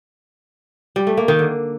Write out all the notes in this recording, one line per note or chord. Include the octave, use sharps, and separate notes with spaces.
G3
A3
A#3
D#3
D3